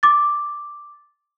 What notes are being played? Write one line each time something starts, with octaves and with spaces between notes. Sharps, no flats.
D6 A6